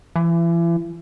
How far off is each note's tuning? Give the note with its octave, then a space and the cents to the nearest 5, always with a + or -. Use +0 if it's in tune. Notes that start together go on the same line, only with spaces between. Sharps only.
E3 +35